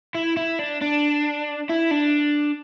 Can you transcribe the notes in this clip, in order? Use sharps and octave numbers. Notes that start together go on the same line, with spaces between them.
E4
E4
D4
D4
E4
D4